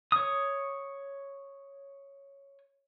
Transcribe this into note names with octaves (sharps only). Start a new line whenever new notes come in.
C#5 D#6